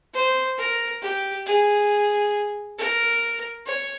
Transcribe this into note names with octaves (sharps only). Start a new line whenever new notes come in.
C5
A#4
G4
G#4
A#4
C#5